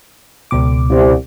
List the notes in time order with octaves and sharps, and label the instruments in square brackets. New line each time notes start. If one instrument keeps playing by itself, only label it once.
[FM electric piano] C#2 B2 D6
[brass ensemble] C2